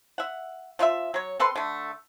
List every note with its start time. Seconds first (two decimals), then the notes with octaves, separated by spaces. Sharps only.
0.18 E5 F#5
0.79 F3 F4 B4 E5
1.14 F#3 C#5
1.40 C4 A4 B4 C6
1.56 D3 A3